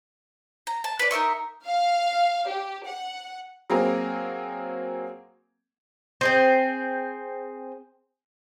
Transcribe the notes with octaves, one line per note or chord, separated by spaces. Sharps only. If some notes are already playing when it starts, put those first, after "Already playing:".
A#5
A5
B4 D5
D#4 A#4 E5 C#6
F5
G4
F#5
F#3 A#3 C4 G#4 A#4
C4 G#4 C5